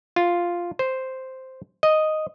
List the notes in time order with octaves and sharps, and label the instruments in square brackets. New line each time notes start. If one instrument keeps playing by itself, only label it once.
[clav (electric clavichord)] F4
C5
D#5